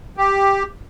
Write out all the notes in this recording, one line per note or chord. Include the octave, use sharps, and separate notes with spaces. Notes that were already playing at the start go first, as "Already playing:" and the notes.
G4